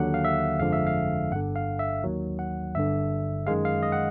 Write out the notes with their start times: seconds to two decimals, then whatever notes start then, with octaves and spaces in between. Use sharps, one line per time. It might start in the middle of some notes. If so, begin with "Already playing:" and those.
Already playing: D#2 D3 F#3 F#5
0.14 F5
0.24 E5
0.59 G1 F2 D3 F3 G#3 F5
0.73 E5
0.87 F5
1.31 G1 G2 D3 F#5
1.56 F5
1.79 E5
2.04 D#2 D#3 F#3
2.39 F#5
2.75 G1 G2 D3 E5
3.47 F#2 D#3 G#3 F5
3.65 F5
3.83 D#5
3.92 F#5